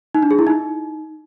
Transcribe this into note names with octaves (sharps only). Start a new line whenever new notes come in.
D#4
D4
G#4
E4
D#4